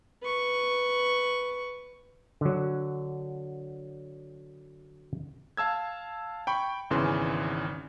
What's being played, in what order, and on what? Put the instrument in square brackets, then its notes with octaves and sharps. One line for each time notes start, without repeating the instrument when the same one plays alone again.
[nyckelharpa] B4 C#6
[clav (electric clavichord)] D3 F#3
[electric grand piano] F5 A5 E6 G#6
G5 B5 C#6
G#1 E2 C#3 E3 C6